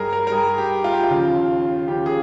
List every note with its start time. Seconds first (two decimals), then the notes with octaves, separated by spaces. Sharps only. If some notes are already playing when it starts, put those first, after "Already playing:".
Already playing: G2 G3 G#4 A#4
0.13 A#4
0.27 A#4
0.32 G2 G3 G#4
0.58 G4
0.84 F4
0.93 G4
1.04 F4
1.10 D#2 C#3 F3
1.88 D#2 C#3 F3 G4
2.06 G#4